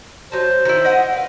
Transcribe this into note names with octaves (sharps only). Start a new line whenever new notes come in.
F#3 C5 A5
D#3 E4
D#5 E5 F#5
B4 F5